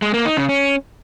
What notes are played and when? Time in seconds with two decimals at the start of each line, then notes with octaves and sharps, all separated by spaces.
0.02 G#3
0.14 A#3
0.25 D#4
0.37 C#3
0.49 C#4